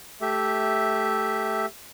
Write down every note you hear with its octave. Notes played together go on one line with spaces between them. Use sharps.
A3 G4 E5